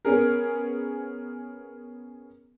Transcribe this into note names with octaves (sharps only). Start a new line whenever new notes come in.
B3 C#4 G#4 A#4